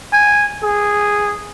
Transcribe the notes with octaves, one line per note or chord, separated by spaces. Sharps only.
G#5
G#4